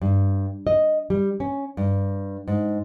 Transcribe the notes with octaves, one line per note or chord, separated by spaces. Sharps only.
G2
D#5
G3
C#4
G2
G#2